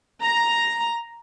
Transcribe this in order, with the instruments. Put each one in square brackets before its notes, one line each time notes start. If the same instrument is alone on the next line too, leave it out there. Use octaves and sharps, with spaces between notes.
[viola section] A#5